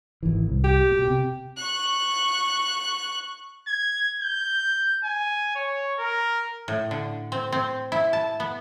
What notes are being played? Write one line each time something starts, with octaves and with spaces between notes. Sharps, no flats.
G#1 E3
C2
G4
B2
C3
C#6 F#6
G#6
G6
G#5
C#5
A#4
A2
D3
C4
C4
E4
A5
B3